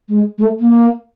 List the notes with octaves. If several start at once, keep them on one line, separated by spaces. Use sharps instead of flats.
G#3
G#3
A3
A#3